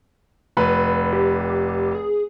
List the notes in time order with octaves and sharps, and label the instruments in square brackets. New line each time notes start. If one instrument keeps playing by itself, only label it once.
[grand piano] F1 B4
[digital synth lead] G4
G#4